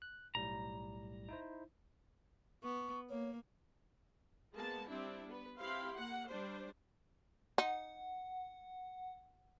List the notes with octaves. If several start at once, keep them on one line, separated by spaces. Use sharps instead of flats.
F#6
B1 A2 G3 A#5
D#4 E4 C5
B3 C#6
A#3 C#5
G#3 A#3 B3 A5
G3 C4 D4 E4
B3 B4
C4 E4 G4 F5 B5 C6
A#3 F#5
G3 D4 C5
D#4 F#5